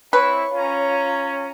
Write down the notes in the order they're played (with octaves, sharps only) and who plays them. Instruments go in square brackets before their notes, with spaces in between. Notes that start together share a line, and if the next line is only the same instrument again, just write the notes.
[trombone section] C4 E4 [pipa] B4 [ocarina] C#5 [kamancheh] C#6
[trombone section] C#4 [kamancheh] F4 A#5